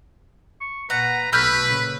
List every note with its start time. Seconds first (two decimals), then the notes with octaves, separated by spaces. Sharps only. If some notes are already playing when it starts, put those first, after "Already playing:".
0.61 C#6
0.90 A#2 B4 F#5 A#5
1.32 B1 B2 A3 B4 B5 F6 G6
1.65 A#2 C#3